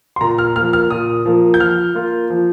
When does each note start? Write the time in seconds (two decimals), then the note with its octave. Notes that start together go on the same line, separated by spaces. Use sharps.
0.16 C6
0.21 A#2 A#5
0.38 F6
0.56 F3 A#3 F6
0.73 F6
0.90 A#2 D#6
1.26 F3 A#3
1.54 G6
1.60 F3 F6
1.95 A#3 F4
2.30 F3